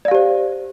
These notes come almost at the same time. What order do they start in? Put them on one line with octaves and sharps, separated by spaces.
D5 F5 G4 C5